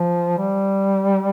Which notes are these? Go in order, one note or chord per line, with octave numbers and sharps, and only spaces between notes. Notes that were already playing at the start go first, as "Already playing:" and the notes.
Already playing: F3
G3